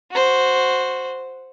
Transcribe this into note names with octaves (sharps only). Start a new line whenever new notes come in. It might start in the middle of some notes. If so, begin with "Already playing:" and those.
F#4 C5